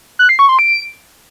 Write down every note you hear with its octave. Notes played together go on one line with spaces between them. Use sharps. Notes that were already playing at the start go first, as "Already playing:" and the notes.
F#6
C7
C#6
C6
D7